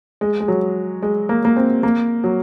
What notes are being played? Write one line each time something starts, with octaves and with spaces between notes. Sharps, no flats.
G#3
G#3
F#3
G#3
A#3
A#3
C4
A#3
F#3